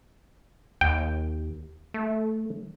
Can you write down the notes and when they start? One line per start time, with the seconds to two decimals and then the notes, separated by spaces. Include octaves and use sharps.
0.81 D#2 G5
1.94 A3